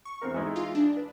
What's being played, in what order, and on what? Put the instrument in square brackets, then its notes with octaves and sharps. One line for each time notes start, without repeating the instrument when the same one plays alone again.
[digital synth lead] C#6
[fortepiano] E2 C4 A#4
E3 G#3 D#4
[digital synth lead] F4
D4
[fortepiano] B4